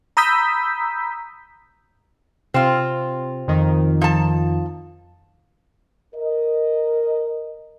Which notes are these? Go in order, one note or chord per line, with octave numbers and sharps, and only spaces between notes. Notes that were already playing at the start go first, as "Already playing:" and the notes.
A#5 B5 D#6 E6 G6 B6
C3 C4 F4
F2 D#3
F3 A5
A#4 D#5